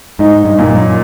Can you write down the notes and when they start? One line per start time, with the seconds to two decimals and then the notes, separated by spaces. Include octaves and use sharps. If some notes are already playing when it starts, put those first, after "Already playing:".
0.19 G#2 D#4
0.45 G2
0.58 A#2
0.64 G2
0.71 F#2